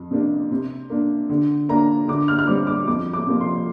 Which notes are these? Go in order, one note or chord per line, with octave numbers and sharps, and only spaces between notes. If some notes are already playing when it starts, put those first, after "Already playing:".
Already playing: F2
C3 A#3 D4
C3
A#3 D4
D3
A#3 D4 A#5
D3 D6
F6
F6
G3 C4 D6
D6
F2 D6
D6
C3 F3 A#3
C6